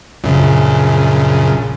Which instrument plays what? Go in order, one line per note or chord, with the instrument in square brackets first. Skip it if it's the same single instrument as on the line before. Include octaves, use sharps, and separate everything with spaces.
[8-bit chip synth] A#1 F#2 C#3